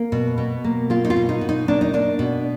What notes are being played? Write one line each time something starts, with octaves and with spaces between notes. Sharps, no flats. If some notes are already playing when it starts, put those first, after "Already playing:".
Already playing: A#3
B2
B2
A#3
A#3 F4
D#4
F4
B2
D#4
B2
D#4
A#3 D4
D#4
A#3 D4
B2